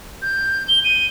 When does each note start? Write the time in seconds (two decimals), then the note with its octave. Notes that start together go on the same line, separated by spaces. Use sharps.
0.22 G6
0.68 G7
0.84 D#7